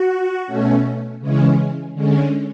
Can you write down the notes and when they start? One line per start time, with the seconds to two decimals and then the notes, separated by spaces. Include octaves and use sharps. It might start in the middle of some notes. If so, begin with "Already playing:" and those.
Already playing: F#4
0.47 B2 A3 C#4
1.20 C#3 E3 G#3 C#4
1.94 D3 G#3 C#4